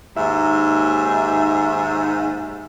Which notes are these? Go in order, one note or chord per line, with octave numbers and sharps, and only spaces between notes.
D#2 G#2 E5